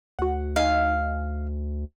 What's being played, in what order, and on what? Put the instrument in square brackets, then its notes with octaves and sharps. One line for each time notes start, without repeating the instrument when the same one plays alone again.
[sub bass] D2 [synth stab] F#4 F#5
[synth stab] D#4 G#5 [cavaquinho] F5